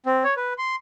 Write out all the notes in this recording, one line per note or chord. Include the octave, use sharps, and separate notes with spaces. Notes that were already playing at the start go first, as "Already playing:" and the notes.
C4
C#5
B4
C6